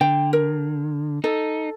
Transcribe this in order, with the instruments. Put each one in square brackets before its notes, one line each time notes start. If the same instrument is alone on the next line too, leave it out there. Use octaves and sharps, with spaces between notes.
[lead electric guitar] D3 [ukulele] G5
[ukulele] A#4
[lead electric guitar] D#4 [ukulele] A4